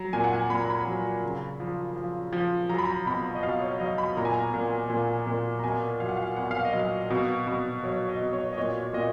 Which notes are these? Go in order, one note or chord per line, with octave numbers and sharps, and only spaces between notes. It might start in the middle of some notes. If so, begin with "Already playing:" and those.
Already playing: F#3 A#5
A#2 G#5
F#5
G#5
A#2 B5
A#5
B5
F#3
C#3
F3
F3
F3
F#3 A#5
B5
A#5
B2 B5
D#5
B2 F5
C#5
F#3 D#5
B5
A#2 A#5
G#5
A#5
A#2
A#2
A#2
A#5
B2 G#5
F#3 F5
F#5
F5
B2 F#5
F5
D#5
F#3
F5
B2
B2
F#3 C#5
D#5
B2
C#5
D#5
A#2 C#5
A#2 D#5